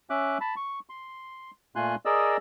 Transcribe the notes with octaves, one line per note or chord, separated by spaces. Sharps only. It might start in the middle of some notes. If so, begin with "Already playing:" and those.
C#4 E5 D6 F#6
A5 B5
C#6
C6
A#2 A3 F4 G#5 C6 F#6
G#4 A#4 D5 D#5 E6